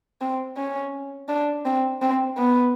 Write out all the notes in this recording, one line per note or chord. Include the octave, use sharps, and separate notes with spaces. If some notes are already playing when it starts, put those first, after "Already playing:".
C4
C#4
D4
C4
C4
B3